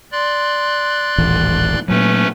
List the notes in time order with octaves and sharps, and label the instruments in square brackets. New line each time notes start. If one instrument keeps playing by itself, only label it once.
[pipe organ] D5 C6 F#6
[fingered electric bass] D#1 A1 E3
[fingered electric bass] A#2 F#3 [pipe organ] A3 C#4 B4